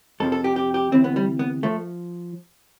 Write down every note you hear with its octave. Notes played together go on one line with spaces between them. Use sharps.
F2 C3 F3 A4
A4
G4
G4
G4
D2 C3 E3 C4
B3
G3
B3
F3 A3